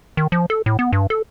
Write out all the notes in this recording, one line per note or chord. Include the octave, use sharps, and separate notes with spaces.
D#3
F3
A4
A2
B3
G2
A4